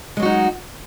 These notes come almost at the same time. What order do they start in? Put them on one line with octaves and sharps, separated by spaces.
G#3 F#3 F#4 D#4